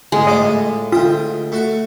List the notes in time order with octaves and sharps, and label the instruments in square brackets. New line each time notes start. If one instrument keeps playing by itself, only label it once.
[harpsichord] D2 G#2 [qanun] G#3
[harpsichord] A2 F4 D6 [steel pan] D#5
[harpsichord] D2 G5 D#6 [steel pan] F4
[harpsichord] A3 F#4 C#6